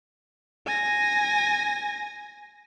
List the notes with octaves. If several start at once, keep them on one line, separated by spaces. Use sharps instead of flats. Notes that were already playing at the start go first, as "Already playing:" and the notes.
G#5 A#6